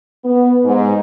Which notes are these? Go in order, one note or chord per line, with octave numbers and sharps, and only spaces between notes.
B3
G#2